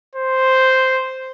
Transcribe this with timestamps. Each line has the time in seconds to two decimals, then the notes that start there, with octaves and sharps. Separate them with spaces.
0.15 C5